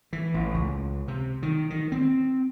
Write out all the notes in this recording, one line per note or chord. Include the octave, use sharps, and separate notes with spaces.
E3
A1
C#2
C3
D#3
D#3
C4